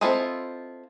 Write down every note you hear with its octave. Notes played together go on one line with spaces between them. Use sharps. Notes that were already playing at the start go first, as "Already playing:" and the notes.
C4 E4 F4 A4 D#5